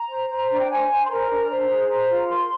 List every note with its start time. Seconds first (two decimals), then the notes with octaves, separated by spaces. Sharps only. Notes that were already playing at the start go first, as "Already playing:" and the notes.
Already playing: A#5
0.08 C5
0.29 C5
0.49 D4
0.59 G5
0.68 C5 G#5
0.89 C5
1.04 C6
1.08 A#4 A#5
1.29 D4
1.49 C5
1.69 G#4
1.88 C5 A#5
2.09 F4
2.29 A#4 C6